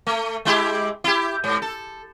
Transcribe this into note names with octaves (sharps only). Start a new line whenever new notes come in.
A3
G#3 E4 G4
E4 G4
G#2
A4